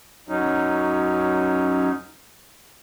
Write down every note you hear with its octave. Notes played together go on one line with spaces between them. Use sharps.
F#2 F#3 C#4 D#4